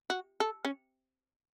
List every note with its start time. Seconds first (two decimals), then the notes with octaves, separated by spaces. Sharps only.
0.10 F#4
0.40 A4
0.65 C#4